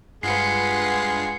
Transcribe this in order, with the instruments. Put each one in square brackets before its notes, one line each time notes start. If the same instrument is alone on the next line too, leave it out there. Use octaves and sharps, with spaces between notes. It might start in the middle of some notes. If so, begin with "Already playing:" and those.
[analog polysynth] G2 F4 [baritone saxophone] G#3 [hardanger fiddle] B4 F#5 [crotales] C7 C#7